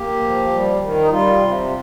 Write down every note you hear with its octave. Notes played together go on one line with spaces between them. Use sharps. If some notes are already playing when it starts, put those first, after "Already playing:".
Already playing: A#3 G4
F3
G3
D#3
D#4
G3 F4
C3